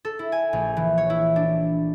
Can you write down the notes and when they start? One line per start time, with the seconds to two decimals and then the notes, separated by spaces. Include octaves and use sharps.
0.05 A4
0.19 E4
0.32 G#5
0.53 A#1
0.77 E3
0.98 C#5
1.10 E4
1.36 D4